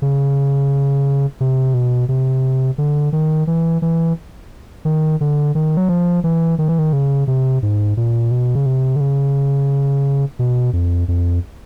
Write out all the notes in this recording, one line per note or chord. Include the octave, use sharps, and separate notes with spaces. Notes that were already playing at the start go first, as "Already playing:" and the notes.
C#3
C3
B2
C3
D3
D#3
E3
E3
D#3
D3
D#3
F#3
F3
E3
D#3
E3
D#3
C#3
C3
G#2
A#2
B2
C#3
C3
D3
C#3
B2
F2
F2